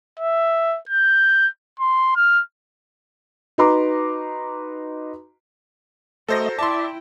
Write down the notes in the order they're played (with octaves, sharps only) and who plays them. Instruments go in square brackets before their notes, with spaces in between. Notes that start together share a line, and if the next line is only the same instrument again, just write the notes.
[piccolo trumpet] E5
G6
C6
F6
[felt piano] D#4 F#4 B4 A#5 C6 D6
[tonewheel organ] A3 D#5 [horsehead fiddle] F#4 A#4 [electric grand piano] A4 C5 A#6
[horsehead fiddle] E4 G5 [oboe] D5 [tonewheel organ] E5 [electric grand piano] A5 C6